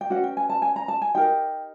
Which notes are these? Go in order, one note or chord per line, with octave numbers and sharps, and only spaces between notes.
G5
C#4 F#4 B4 F#5
G5
G#5
A5
G#5
A#5
A5
G#5
D#4 G4 A#4 G5